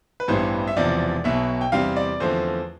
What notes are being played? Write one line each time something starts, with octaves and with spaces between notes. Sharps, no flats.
B4
A1 G2 E3 G3 B3 C5
E5
E1 E2 C3 F3 D5
B1 B2 B3 E5
G5
E2 C3 G3 C4 F5
D5
E2 D3 F3 A3 C4 C5